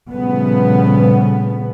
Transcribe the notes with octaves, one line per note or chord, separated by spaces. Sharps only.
A#2 C#3 F3 G3 A3 B3